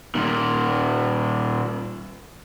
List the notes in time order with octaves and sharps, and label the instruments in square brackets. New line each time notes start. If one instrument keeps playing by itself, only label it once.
[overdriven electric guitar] A#2 D#3